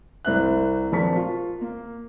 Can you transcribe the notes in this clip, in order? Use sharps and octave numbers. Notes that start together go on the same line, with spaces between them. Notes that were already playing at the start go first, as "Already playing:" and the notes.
C2 C4 E5 F#6
A#1 C4 A#4 A5 C#6 B6
F4
A#3